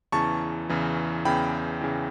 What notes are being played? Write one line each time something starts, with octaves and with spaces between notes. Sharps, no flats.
E2 C#3 E3 A5 C#6
E2 C#3 E3
E2 C#3 E3 G5 B5
C#3 E3